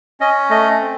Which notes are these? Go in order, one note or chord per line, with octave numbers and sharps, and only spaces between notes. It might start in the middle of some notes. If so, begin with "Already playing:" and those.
C#4 D#5
A3 D#5
C4